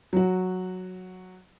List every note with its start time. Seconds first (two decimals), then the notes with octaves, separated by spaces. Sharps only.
0.13 F#3 F#4